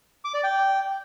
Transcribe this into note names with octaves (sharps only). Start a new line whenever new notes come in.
D6
D5
G5